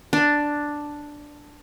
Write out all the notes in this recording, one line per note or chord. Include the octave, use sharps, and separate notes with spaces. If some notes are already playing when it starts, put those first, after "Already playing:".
D4